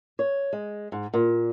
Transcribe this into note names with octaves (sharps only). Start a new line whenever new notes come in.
C#5
G#3
G#2
A#2